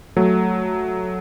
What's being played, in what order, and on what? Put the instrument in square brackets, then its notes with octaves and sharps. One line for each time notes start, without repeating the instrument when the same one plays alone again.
[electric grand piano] F#3 A3